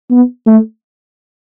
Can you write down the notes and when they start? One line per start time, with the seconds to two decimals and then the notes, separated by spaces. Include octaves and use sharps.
0.10 B3
0.46 A3